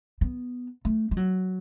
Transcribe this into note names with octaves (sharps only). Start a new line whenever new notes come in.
B3
A3
G#3
F#3